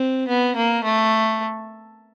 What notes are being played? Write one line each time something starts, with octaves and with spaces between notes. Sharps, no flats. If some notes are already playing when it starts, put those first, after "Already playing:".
Already playing: C4
B3
A#3
A3